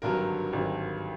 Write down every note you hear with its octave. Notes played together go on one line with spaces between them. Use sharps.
G#1 G2 D3 F#3 A#4
G#1 G2 D3 F#3